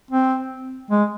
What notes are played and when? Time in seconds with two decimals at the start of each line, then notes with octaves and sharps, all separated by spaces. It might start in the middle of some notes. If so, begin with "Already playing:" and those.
0.11 C4
0.91 G#3